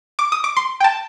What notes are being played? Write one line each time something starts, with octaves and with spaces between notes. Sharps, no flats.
D6
D#6
D6
C6
G5
A5